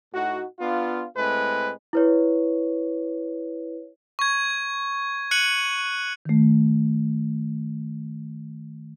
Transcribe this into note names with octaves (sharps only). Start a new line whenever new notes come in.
A2 D#4 F#4
B3 D4 F4
A2 G#3 C4 B4
E4 B4 C#5
C#6 G#6
F#6 C#7 D#7 F#7
D#3 A3